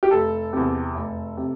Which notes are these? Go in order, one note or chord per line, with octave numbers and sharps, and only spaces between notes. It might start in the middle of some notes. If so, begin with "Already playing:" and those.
G4
F1 A4
E2 C3
F1
C3